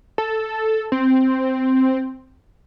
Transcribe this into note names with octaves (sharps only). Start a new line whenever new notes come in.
A4
C4